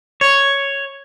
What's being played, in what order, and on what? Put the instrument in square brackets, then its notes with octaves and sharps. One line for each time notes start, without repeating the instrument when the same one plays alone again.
[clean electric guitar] C#5